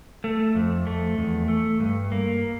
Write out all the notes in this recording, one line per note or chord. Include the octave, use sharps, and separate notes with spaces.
A3
F2
A3
E2
A3
G2
A#3